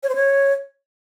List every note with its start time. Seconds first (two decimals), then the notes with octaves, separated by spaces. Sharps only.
0.03 C#5
0.09 C5
0.15 C#5